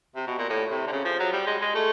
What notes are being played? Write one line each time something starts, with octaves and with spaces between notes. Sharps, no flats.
C3
B2
A#2
A2
C3
D3
C#3
F3
F#3
G3
G#3
G#3
A3